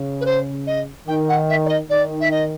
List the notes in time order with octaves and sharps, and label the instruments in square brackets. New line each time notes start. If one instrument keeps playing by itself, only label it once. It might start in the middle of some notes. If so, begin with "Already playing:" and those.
Already playing: [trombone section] C#3
[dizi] B4
C5
D#5
[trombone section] D#3 [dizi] G5
[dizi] F#5
E5
D5
D#5
[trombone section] D#3 [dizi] D5
[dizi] E5
D#5